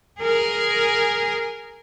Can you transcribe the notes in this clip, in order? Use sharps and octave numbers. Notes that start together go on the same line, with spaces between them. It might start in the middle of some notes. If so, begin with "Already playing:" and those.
G#4 A#4